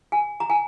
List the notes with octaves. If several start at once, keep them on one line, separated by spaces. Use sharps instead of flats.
G#5
A#5
G#5